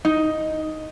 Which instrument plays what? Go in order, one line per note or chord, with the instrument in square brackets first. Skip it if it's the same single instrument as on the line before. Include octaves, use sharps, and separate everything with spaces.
[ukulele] D#4